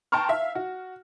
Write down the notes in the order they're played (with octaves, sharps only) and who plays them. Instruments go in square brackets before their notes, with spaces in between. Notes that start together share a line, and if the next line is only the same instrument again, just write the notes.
[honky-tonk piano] G5 A5 A#5 C6 C#6 F6
E5 F5
F#4